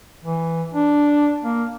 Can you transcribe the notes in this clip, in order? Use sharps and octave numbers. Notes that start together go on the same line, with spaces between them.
E3
D4
A#3